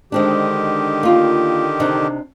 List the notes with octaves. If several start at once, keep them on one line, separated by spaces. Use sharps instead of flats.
D3 D#3 G#3 C4 D4 G4
A#3 F4
C3 D4 D#4